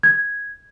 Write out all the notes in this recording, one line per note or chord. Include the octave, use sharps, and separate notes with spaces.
G#6